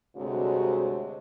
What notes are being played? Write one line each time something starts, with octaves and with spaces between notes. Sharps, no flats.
D2 G2 C3 G#3 F#4 C#5